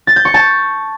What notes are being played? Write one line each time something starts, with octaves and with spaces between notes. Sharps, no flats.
A6
G6
C#6
A5